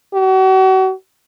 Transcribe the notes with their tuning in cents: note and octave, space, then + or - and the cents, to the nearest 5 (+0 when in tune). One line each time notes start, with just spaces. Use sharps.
F#4 +40